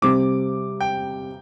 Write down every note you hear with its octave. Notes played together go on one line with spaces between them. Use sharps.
C3 G3 C4 D6
G5